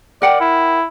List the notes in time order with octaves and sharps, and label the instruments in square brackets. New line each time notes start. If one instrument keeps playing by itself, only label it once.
[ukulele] A#4 F#5 G5 [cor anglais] D5
[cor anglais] E4